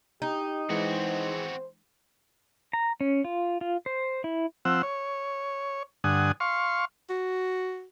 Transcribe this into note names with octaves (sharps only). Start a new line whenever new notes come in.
D#4 G4
E3 G#3 C4 F#4 C5
A#5
C#4
F4
F4
C5
E4
F3 C4 F#5 E6
C#5
G2 D3 F#5 G#5 D#6
F5 C6 C#6
F#4